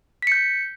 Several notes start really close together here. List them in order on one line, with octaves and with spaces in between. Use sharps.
B6 C#7 G6